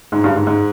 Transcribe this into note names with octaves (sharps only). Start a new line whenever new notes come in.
G#2
G2
G#2
G#2